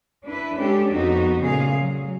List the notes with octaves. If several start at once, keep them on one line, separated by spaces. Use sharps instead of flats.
D4 E4 B4
G#3 C#4 D4 G4 A4
F2 B3 D#4 F#4
A#2 C#3 A3 G#4 F5
F#3